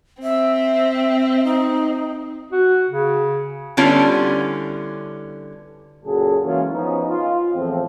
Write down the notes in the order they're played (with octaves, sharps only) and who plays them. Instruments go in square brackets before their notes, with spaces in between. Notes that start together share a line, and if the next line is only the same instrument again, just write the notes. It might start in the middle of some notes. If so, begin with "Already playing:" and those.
[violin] C4 [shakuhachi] E5
[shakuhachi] D#4
[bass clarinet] F#4
C#3
[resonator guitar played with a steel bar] D3 G3 B3 C#4 E4 F4
[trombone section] F#2 A#2 C#3 F#3 G#4 A4
E3 F#3 G#3 A#3 C#4 F4
F3 B3 C#4 D#4
F4
E2 A2 F3 C4